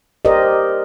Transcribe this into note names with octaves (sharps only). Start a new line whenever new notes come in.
G4 A#4 C5 D5 D#5